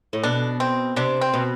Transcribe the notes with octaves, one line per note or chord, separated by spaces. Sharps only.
A2
B2 D4
C4
C3 D4
C4
B2